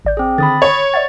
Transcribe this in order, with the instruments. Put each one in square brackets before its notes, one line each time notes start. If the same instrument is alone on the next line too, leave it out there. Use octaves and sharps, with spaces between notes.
[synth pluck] A1 D5 G6
[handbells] C4 G#4
[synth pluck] D3 D#3 [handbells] B5 D#6 A6
[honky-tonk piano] C#5
[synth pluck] D5 E5 F#5 [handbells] A6